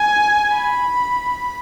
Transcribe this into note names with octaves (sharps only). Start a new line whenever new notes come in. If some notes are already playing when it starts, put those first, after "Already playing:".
Already playing: G#5
B5